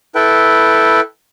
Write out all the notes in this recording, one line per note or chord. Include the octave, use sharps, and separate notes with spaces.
E4 A4 B4 G5